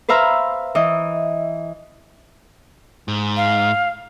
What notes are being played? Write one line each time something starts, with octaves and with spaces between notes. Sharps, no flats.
B4 C5 E5 F5 A#5 B5
E3 D#5
G#2
F5